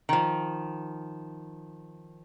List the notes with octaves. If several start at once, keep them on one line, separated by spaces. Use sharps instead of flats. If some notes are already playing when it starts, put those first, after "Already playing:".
D#3 F3